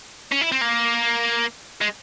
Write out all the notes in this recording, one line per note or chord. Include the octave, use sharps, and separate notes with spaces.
C#4
E4
C4
A#3
G#3